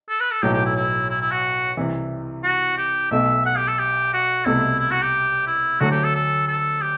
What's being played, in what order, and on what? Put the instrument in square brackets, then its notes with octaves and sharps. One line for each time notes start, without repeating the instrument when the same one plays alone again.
[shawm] A4
B4
A4
[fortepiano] B1 A2 F#3 [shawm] G4
[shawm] G4
E4
E4
E4
E4
F#4
[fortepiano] C2 C3 E3
[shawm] F#4
G4
[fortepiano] B1 B2 A3 [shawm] E5
[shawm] F#5
G4
A4
G4
F#4
[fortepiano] C2 B2 A3 [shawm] E4
[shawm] E4
F#4
G4
E4
[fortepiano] D2 D3 F#3 A3 [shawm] F#4
[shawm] G4
A4
A4
A4
G4